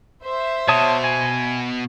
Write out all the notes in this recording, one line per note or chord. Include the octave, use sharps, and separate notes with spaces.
C5 E5
B2 C#5 A5 D#6
G#5